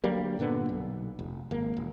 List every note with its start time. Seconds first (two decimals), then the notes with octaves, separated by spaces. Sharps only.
0.04 D2 F#3 G3 A#3
0.39 G2 A#2 D3 B3
0.69 B1
1.19 F1
1.51 G#1 A#3
1.77 E1